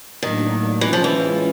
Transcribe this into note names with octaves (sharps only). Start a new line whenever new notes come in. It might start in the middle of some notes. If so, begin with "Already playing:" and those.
A2 D#3 F#3 A#3 D4
E3 G#3 C#4 F4
F3
E3